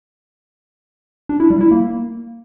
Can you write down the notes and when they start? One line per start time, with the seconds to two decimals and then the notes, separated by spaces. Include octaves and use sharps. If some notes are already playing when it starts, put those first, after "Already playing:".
1.29 D4
1.40 E4
1.50 G3
1.61 E4
1.71 A#3